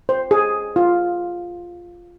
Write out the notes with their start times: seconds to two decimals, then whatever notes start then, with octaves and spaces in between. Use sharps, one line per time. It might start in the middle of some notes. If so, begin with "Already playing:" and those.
0.09 C5
0.31 G#4
0.76 F4